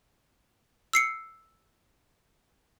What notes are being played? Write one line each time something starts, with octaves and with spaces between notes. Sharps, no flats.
E6 C7 C#7